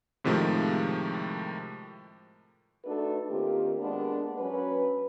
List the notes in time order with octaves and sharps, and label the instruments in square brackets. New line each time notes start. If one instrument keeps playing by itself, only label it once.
[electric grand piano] A2 C3 D#3 F3 G#3 A3
[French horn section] A3 D4 D#4 F#4 A4 B4
D#3 A#3 C4 F4 G4
G#3 A#3 B3 D4
F#3 C#4 B4